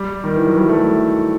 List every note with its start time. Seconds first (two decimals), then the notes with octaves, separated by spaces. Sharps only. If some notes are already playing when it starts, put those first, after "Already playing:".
Already playing: G3
0.24 D#3
0.36 E3
0.47 F#3
0.57 G3
0.69 A3